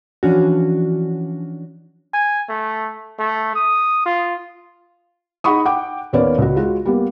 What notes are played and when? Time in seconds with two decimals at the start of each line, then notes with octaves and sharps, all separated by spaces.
0.23 E3 F3 C#4 D4 F#4
2.14 G#5
2.49 A3
3.19 A3
3.55 D#6
4.06 F4
5.44 D#4 G#4 F#5 B5 C#6 D#6
5.65 F#5 G5 D6
6.13 D#2 A#3 B3 C#4 B4 D5
6.38 C#2 F#4
6.56 G#3 F4 F#4
6.86 G3 A#3 B3